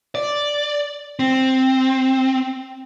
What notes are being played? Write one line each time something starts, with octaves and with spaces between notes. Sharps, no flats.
D5
C4